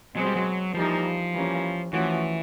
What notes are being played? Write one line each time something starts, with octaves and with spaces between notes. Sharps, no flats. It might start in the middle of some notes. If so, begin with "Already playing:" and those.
B2 F#3 G#3 C4
G3
F#3
E3 F3 G3 A#3 D#4
E3 G3 A#3 C#4
E3 F3 A3 C#4 F#4